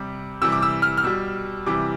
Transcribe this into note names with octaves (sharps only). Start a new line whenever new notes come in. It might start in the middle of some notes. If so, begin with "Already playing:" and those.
Already playing: C3 G3
C3 E3 G3 E6
D6
E6
F6
F6
B2 G3 E6
C3 E3 G3 D6